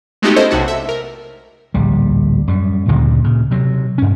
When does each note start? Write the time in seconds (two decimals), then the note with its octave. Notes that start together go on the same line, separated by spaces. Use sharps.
0.22 G#3 A3 B3 D#4 F#4 G4
0.36 C#4 E4 A4 C5 D#5
0.51 B1 C3 F#4 A5
0.68 E5
0.89 A#4
1.74 D1 A#1 G3
2.48 F#2 G3
2.88 D2 G2 A#2 C#3
3.24 A#2 C#3
3.51 C3 F#3
3.98 G2 C#4